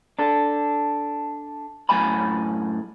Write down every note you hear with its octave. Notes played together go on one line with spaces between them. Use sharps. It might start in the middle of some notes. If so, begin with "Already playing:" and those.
D4 A4
F#2 A2 G#5 B5